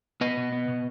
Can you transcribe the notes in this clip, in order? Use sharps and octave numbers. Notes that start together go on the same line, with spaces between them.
B3 B4 D#5
B2
B3
B2